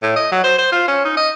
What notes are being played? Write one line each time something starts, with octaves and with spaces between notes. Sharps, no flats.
A2
D#5
F#3
C5
C5
F4
C#4
D#4
D#5